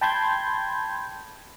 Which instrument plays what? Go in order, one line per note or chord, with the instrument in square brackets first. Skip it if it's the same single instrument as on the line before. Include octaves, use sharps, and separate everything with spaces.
[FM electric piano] G5 A5 B5 C6 G6 G#6